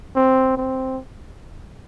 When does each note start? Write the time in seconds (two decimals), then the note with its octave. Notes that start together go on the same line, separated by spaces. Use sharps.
0.16 C4
0.57 C4